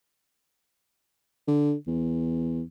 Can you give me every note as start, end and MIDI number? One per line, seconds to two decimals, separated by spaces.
1.48 1.74 50
1.87 2.63 40